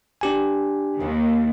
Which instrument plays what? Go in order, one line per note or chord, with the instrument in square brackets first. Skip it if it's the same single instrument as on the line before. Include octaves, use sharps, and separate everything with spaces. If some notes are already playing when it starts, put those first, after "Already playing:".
[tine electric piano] D4 G4 G#5
[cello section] D#2 D#3